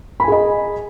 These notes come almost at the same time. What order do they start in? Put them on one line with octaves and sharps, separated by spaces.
B5 G#5 G#4 D#5